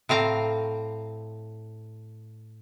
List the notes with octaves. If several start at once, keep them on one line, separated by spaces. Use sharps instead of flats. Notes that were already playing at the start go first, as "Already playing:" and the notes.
A2 C4 F5 A#5